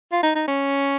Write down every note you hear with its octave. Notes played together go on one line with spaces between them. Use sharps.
F4
D#4
D#4
C#4